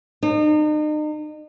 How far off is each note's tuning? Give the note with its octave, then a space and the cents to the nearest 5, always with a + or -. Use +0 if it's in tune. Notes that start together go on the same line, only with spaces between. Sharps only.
D#4 -40